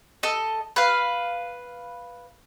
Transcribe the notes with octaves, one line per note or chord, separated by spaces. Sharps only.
A4 D#5
B4 F5